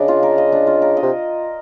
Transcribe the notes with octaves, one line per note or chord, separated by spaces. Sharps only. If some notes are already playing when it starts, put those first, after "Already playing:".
Already playing: C#3 D4 D#5
F4
A#4
D#5
D4
F4
A#4
D#5
C3